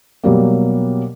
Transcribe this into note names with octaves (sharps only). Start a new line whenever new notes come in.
B2 F#3 G3 A#3